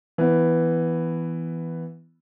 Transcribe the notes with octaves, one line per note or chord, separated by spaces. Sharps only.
E3 B3